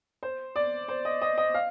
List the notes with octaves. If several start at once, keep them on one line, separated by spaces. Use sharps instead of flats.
C5
D5
C5
D#5
D#5
D#5
F5